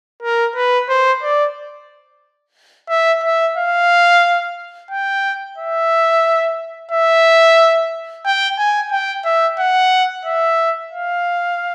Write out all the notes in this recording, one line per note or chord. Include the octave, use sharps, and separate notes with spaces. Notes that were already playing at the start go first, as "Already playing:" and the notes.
A#4
B4
C5
D5
E5
E5
F5
G5
E5
E5
G5
G#5
G5
E5
F#5
E5
F5